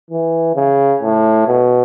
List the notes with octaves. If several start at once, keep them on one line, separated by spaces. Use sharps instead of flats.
E3
C#3
A2
B2